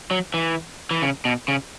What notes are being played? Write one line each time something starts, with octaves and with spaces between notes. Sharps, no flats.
F#3
E3
E3
C#3
B2
C#3